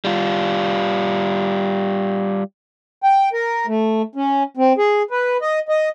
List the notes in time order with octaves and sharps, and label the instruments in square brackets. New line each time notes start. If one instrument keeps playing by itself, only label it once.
[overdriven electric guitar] G3 F4
[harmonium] G5
A#4
A3
C#4
C4
G#4
B4
D#5
D#5